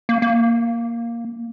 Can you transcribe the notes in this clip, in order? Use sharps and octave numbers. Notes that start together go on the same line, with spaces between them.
A#3
A#3